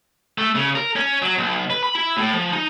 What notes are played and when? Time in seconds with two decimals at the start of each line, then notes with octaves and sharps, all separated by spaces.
0.38 A3
0.55 C#3
0.75 A#4
0.96 C#4
1.22 F#3
1.38 B1
1.70 B4
1.83 B5
1.95 E4
2.18 A2
2.34 F3
2.53 D#4